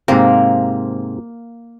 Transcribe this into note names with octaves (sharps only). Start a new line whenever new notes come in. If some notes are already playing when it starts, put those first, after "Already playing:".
G#2 C3 A#3 C4